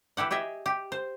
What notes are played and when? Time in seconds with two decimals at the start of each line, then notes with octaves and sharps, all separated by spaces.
0.17 E3 E4 G4 F#5
0.31 G4 G#4 D#5 E5
0.66 G4
0.92 C5